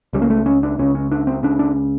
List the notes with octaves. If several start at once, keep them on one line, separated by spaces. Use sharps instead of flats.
C#2 C#3 G3
A#3
A3
C#4
D4
C#2 C#3 C#4
C#4
D4
C4
C#2 C#3 D4
D4